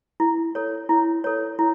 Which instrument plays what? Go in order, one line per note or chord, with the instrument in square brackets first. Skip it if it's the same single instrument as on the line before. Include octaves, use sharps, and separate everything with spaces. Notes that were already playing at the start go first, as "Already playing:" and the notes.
[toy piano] E4
A4 C#5
E4
A4 C#5
E4